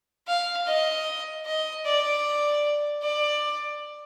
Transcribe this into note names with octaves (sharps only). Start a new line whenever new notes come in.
F5
D#5
D#5
D5
D5